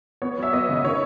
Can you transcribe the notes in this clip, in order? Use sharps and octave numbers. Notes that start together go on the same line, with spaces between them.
B3 C#5
F#3 E5
B3 D#5
C#3
D#3 C#5